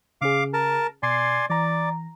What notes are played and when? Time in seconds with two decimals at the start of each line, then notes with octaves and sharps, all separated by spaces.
0.21 C#3 C#4 G#4 F5 D6
0.53 A#4 A5
1.03 B2 D5 G#5 C6 C7
1.50 E3 D5 A#5